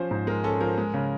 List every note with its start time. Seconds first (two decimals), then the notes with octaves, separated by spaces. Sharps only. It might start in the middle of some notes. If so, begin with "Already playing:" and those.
Already playing: F3 C#4 C5
0.11 G#2
0.27 G#3 A#4
0.44 C#4 A4
0.61 F3 A#4
0.78 G#3
0.94 C#3